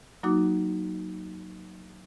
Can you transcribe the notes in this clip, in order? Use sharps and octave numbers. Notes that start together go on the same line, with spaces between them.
F#3 A#3 D#4 F#4 D6